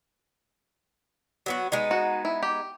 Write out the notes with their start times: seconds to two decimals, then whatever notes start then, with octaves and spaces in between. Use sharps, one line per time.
1.46 F#3 B3 F#4
1.72 G#3 B3 D#4
1.91 F#4
2.25 E4
2.43 G4